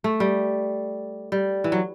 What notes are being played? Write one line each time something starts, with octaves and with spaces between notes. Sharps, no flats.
A3
G3
G3
E3
F#3